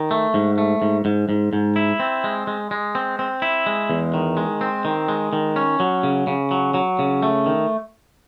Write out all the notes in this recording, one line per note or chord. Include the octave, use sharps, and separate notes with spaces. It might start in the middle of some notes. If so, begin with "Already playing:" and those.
Already playing: D#3
A3
G#2
A3
G#2
G#2
G#2
G#2
E4
C4
G#3
G#3
G#3
C4
C4
E4
G#3
E2
D#3
G#3
C4
D#3
G#3
D#3
C#4
F#3
C#3
C#3
F#3
F#3
C#3
A3
D#3